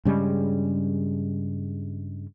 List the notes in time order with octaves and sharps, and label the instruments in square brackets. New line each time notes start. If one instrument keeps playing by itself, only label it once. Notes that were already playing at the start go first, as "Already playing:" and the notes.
[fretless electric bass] G2 C#3 G3 G#3